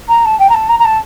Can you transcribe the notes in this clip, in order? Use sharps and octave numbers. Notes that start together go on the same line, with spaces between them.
A#5
A5
G5
A#5
A5
A#5
A#5
A5